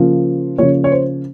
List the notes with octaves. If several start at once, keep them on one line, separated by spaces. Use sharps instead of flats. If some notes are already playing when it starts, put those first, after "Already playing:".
Already playing: C#3 F3 A#3
C#3 F3 A#3 C#5
C#5
C5